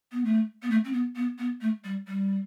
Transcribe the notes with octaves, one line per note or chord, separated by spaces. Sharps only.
B3
A3
B3
A3
C4
B3
B3
B3
A3
G3
G3